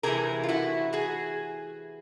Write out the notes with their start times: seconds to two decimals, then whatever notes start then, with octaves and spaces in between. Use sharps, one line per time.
0.03 C3 E3 A3 G#4 A#4
0.43 F4
0.48 E4 F#4
0.93 F#4 G#4